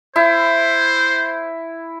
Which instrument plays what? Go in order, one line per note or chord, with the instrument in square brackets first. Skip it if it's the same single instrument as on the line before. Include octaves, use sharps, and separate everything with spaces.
[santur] E4 [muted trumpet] C5